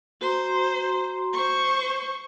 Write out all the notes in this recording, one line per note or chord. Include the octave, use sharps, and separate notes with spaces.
F#4 C5 A#5 C6
C5 C#6